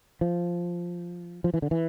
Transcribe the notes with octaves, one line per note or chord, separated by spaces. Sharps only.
F3
F3
E3
D3
E3